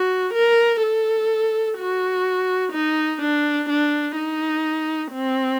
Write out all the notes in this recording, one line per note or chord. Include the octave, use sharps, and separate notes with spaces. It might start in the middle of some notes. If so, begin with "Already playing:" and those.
Already playing: F#4
A#4
A4
F#4
D#4
D4
D4
D#4
C4